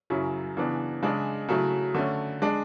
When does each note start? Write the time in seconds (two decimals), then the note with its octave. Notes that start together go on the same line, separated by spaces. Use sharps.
0.10 F#2 C#3 F#3 C#4 E4
0.57 C#3 E3 B3 D4
1.02 C#3 G#3 D4
1.48 C#3 F#3 A3 E4
1.95 D3 A3 C#4
2.42 G#3 D4